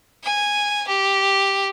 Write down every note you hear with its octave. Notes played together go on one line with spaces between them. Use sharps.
G#5
G4